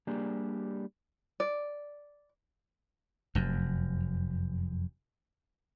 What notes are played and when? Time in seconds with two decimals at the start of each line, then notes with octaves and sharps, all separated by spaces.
0.07 G3 A#3 D4 G4 G#4
1.40 D5
3.35 F1 F#2